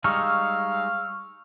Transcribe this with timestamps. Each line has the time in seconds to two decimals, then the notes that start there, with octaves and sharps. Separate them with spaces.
0.04 G3 G#3 D#4 F5 C#6 E6 F6